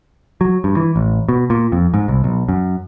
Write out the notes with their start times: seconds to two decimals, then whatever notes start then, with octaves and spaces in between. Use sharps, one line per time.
0.41 F#3
0.64 G2
0.77 E3
0.96 A1
1.29 B2
1.50 A#2
1.72 F2
1.94 G#2
2.08 C2
2.24 B1
2.48 F#2